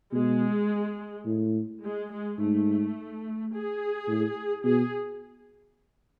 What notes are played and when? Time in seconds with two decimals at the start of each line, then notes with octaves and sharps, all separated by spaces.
0.13 B2 G#3
1.25 A2
1.83 G#3
2.11 G#3
2.39 G#2 A3
3.52 G#4
4.08 A2
4.64 B2 G#4